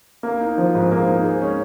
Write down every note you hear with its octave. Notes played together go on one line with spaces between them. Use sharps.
A#3
D#4
F3
G#2
A#3
D#4
G#3
C#4